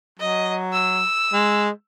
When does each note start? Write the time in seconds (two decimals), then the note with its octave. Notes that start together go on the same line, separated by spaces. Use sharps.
0.20 F#3 D#5
0.73 E6
1.33 G#3